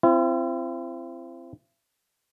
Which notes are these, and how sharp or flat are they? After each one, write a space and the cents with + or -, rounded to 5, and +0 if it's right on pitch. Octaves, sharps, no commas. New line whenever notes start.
C4 +0 E4 +45